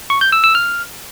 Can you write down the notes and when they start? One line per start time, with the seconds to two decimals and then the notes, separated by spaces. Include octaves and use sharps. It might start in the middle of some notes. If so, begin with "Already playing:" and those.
0.10 C#6
0.21 G6
0.32 E6
0.44 E6
0.55 F6